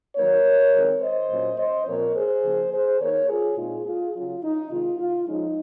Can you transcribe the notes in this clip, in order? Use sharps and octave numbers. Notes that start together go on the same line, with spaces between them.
D#3 F#3 A#3 D#4 A#4 C#5
D#3 G#3 C4
C5 D#5
A#2 F#3 C#4
C5 D#5
A#2 F3 C4 A#4 C#5
G#4 C5
C#3 F3 A#3
G#4 C5
D#3 A#3 D#4 A#4 C#5
F4 G#4
A#2 G#3 C4 D#4 F4 G#4
F4 G#4
C#3 F#3 C#4 F4
D#4
C3 D#3 G#3 D#4 F4
F4
F3 G#3 C#4 D#4